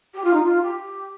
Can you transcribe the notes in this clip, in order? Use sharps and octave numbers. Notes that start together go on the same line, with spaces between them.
G4
F4
D#4
F4
G4